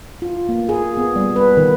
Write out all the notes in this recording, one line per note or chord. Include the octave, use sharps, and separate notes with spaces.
F4
A#3
G#4
B3
G3
B4
D#3